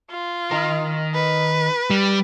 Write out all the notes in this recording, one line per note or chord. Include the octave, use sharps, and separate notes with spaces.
F4
D#3 A#4
B4
G3